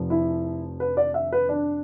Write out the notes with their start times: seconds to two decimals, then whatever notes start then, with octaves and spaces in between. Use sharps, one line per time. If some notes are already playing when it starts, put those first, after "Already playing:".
Already playing: F1 F3
0.10 E4
0.80 B4
0.97 D5
1.14 E5
1.32 B4
1.49 D4